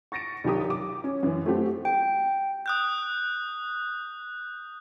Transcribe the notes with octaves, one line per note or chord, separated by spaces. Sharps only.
C#6 A6 A#6 C#7 D7
C2 D#3 F#3 G4 D#6
D6
C#4
F#2 E3
A3 C4 F#4 G4
G5
D#6 F#6 G6